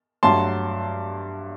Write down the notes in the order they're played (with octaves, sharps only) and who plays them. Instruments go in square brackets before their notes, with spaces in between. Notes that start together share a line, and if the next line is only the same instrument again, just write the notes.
[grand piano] G2 F#3 A3 A5 C6